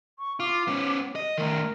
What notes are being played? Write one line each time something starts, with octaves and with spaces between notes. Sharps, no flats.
C#6
F4 D6
B3 C#4
D#5
D#3 A3 A#4